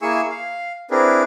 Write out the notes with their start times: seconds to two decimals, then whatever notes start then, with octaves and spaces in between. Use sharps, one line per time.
0.02 A#3 E4 G#4 G#5 C#6 E6
0.29 F5
0.91 C4 D4 E4 G#4 A#4 B4